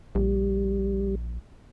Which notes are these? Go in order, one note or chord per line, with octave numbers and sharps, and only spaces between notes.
A#1 G3